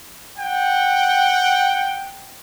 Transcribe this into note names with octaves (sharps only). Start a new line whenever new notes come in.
F#5 G5